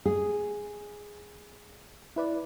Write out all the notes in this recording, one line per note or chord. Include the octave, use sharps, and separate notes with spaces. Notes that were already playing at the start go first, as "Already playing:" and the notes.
G#4
E4 B4 D5